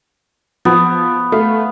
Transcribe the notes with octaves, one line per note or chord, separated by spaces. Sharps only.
F3 B3
A3 F5